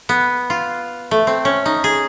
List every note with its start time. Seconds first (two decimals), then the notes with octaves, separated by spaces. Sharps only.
0.09 B3
0.50 F4
1.11 A3
1.27 C4
1.45 C#4
1.66 D#4
1.84 G#4